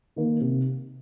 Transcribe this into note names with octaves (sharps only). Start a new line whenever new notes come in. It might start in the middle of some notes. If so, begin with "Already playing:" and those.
D#3 A#3
C3